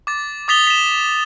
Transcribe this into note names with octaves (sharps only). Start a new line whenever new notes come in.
D6 A6
D6 D#6 A6 B6 F7 G7
B6 E7